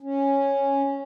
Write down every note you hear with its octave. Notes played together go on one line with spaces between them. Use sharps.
C#4